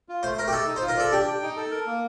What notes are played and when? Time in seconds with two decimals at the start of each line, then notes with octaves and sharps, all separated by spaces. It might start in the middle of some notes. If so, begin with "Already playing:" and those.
0.09 F4
0.23 A3 C5
0.38 A3 A#4
0.48 G4
0.52 D#4 A4
0.67 D#4
0.76 C5
0.82 F4
0.88 A#4
0.97 A4 D5
1.12 D4 G4
1.27 G5
1.42 D#4
1.57 A4
1.71 A#4
1.87 A#3